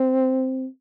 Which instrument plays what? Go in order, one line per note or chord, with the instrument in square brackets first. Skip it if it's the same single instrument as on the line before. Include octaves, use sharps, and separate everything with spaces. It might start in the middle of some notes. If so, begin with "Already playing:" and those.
Already playing: [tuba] C4